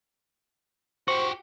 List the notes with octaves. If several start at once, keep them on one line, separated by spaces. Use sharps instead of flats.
F#4 G4 C5 C#6